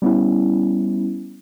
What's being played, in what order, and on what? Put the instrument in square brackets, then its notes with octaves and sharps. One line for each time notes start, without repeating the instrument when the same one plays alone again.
[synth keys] G3 B3 C#4 E4